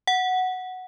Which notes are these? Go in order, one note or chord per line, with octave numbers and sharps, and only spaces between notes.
F#5